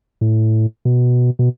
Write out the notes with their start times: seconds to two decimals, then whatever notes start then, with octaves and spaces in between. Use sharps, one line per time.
0.21 A2
0.85 B2
1.39 B2